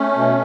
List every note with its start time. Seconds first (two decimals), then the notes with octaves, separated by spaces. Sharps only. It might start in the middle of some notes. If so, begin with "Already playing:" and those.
Already playing: A3 C#4
0.16 B2